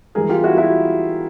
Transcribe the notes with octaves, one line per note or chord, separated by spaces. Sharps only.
G2 E3 G#4 A#4
F4 G4
E4 F#4
E4 F#4